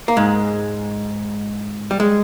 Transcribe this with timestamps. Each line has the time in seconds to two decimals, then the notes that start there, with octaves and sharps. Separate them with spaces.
0.08 A#3
0.17 G#2 G#3
1.91 G3
2.00 G#3